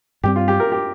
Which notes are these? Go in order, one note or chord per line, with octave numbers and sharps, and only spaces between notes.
G2 G3 C4 G4
F4
G4
A#4
G4